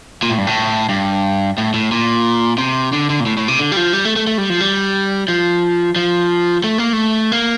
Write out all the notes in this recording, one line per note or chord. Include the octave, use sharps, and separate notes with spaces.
A#2
A2
G2
A2
G2
A2
A2
A#2
C3
D3
D3
A#2
A2
A2
C3
D3
G3
F3
G3
A3
A3
A3
G3
F3
G3
F3
F3
A3
A#3
A3
A#3